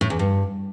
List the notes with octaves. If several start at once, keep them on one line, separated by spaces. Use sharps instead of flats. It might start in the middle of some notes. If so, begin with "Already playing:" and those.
A2
E2
G2